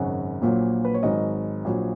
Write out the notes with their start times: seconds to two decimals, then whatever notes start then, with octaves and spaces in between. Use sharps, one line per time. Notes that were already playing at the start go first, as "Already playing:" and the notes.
Already playing: G#1 F#2 C#3 F#5
0.42 A#1 A#2 F#3
0.85 B4
0.94 C#5
1.03 G#1 G#2 F#3 D#5
1.65 A#1 A#2 F#3